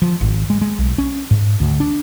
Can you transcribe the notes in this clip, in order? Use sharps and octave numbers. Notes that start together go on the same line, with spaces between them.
F3
G#1
G#3
G#3
B1
C#4
G#2
D2
D4